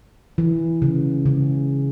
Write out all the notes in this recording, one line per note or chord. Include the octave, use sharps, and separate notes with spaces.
E3
C#3
C#3